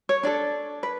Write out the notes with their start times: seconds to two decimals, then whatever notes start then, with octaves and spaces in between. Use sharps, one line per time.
0.09 C#5
0.23 D4 A4 D5
0.83 B4